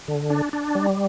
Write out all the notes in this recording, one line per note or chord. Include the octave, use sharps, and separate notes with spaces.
D3
D4
D4
G3